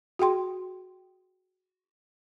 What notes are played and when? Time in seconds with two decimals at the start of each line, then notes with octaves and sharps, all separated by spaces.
0.19 F#4 G#4 G5 C6